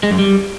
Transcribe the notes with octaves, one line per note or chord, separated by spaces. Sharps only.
G#3
F#2
G3